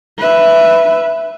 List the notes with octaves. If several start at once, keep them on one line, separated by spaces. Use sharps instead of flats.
B4 E5